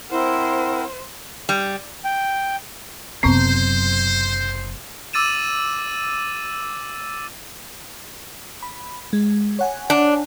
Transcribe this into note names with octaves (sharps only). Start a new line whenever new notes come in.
C4 E4 A#4 C5 F#5
G3
G5
F#1 F#2 C3 B3 C4 C5
D6 E6 A6 D#7 E7
B5
G#3
C#5 F#5 G#5
D4